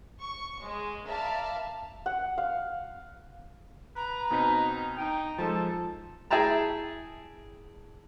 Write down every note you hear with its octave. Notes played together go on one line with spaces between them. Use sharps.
C#6
G#3
A#4 D5 E5 F5 A5 B5
F#5
F5
B4 A#5
B2 C4 D#4 B6
D#4 G5
F3 G#3 A4 A5
E4 G#4 E5 G5 A5 A#5